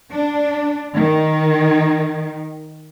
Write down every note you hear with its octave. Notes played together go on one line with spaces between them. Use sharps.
D4
D#3